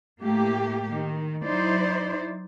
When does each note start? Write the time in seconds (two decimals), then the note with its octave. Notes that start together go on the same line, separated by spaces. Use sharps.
0.23 A2 A3 A#3 G4
0.92 D#3
1.43 F#3 D#4 E4 C5 D5